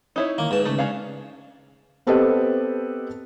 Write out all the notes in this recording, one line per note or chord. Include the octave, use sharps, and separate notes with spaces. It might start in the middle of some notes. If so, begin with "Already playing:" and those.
D#4 E4 C#5
D#3 A#3
G#2 B4 A5
C#3 A3
C#4 D4 F5
B3 C4 G4 A4 B4 D#5